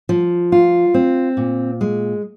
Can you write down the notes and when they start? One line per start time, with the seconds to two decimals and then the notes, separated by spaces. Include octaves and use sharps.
0.09 F3
0.52 F4
0.94 C4
1.37 A#2
1.81 G#3